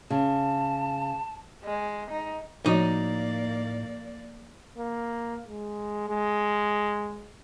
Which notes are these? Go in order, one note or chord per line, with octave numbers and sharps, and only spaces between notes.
C#3 A5
G#3
D#4
A2 F3 A#3 D#4 F#4 C#5 D5
A#3
G#3
G#3